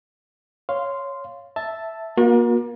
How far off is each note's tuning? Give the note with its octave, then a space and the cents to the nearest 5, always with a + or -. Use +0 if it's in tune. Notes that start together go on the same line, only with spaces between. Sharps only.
C#5 +0 F5 +0 C6 -10
E5 +0 A5 +0
A#3 +30 F#4 -40